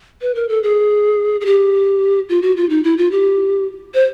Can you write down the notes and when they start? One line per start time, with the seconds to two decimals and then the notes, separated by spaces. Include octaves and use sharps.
0.21 B4
0.35 A#4
0.49 A4
0.63 G#4
1.41 G#4
1.45 G4
2.29 F4
2.42 F#4
2.57 F4
2.69 D#4
2.84 E4
2.98 F4
3.11 G4
3.94 C5